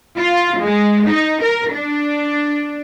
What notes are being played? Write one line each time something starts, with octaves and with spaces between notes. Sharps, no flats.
F4
G#3
D#4
A#4
D4